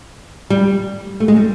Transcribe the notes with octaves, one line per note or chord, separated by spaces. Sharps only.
G3
A3
G#3
G3